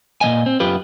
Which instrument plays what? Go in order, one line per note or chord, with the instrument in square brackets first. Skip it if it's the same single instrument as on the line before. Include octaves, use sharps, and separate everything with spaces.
[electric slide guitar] A#2 G3 D#5 G#5
C4
F#2 F4 G4 B4